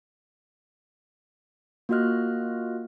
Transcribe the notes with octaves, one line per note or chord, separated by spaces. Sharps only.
A#3 F4 F#4 D#5 F6 F#6